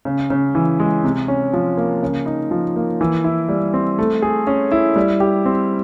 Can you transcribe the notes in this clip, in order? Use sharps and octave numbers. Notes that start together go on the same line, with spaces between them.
C#3
C#3
E3
G#3
C3
C#4
F3
A#3
C#3
D#4
F3
A#3
E3
E4
G3
C4
A3
G#4
C#4
E4
G3
G4
C4